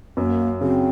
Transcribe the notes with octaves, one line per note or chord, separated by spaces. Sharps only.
F#2 A#3
C#3 F#3 C4